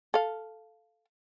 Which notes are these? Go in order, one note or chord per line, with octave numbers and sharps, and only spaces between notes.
A4 F5